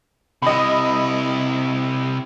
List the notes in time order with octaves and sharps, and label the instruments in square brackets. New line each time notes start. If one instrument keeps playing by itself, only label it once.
[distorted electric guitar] C3 E4 [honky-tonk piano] D#5 B5